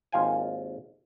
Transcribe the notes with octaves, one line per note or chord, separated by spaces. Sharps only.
G#1 D#2 F4 F5 G5 G#5